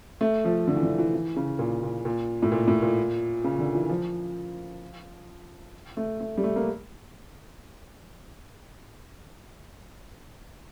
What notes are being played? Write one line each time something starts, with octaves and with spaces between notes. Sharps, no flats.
A3
F3
D3
E3
D3
E3
E3
C#3
A#2
A#2
A#2
A2
A#2
A2
A#2
C#3
D3
E3
F3
A3
A3
G3
A3
A#3